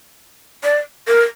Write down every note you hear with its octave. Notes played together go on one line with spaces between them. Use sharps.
D5
A#4